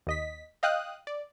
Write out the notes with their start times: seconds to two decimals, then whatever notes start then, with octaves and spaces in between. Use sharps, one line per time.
0.07 D#2 D#5 B6
0.63 D#5 F5 G5 D#6 F#6
1.07 D5